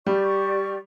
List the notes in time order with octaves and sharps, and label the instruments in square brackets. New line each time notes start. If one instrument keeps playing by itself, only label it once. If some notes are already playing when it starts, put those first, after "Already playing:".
[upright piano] G3 [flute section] G4 D5 C#6